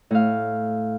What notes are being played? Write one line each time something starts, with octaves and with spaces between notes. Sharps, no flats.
A2 F5